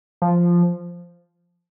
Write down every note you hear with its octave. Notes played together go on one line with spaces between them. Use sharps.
F3